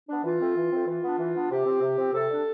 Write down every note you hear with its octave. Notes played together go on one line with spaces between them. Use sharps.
B3 D4
E3 F4
A3 C4
E3
A3 C4
E3 F4
B3 D4
E3
B3 D4
C3 G4
F3 C4
C3
F3 C4
C3 A4
G3 D4